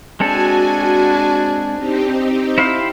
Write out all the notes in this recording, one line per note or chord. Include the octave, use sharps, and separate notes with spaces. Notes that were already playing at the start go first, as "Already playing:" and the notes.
G#3 C4 D4 F#4 A4 G#5
C4 D#4 G4
E4 C5 F5